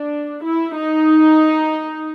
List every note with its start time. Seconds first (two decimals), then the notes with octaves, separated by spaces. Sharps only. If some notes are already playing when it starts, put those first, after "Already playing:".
Already playing: D4
0.44 E4
0.76 D#4